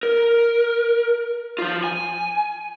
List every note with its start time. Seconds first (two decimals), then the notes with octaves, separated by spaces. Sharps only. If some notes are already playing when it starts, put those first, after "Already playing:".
0.03 A#4
1.58 F3 F4
1.84 G#5